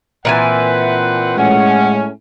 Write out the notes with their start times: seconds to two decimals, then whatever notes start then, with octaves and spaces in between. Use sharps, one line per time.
0.25 A#2 E3 C4 B4 E5 F#5 G#5
1.37 A2 G#3 C#4 F#5